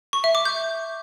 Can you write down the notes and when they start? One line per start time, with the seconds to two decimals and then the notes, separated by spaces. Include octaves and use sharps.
0.13 C#6
0.24 E5
0.35 D6
0.45 G6